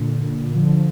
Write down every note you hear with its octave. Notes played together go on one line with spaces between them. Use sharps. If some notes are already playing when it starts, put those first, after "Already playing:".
Already playing: A#2 D3
D3 F3